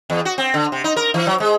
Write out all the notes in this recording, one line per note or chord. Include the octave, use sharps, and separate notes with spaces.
E2
F#4
C4
D3
C3
D#4
A#4
E3
F#3
G#3